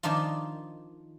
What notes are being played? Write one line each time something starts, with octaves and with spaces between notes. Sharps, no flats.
D#3 F3 D4 D#4 F4